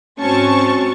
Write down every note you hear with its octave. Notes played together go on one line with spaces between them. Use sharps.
G#2 C4 C#4 F#4 A5 C#6